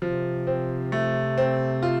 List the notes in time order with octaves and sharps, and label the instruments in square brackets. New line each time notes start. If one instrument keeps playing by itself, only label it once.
[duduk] C3 [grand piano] F3
[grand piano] C4
A3
C4
F4